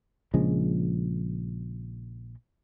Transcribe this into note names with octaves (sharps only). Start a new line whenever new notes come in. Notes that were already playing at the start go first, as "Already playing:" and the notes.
A#1 C#3 F3 G#3